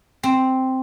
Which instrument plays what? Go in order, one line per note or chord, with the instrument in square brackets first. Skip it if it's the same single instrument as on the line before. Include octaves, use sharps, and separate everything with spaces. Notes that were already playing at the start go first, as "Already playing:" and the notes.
[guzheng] C4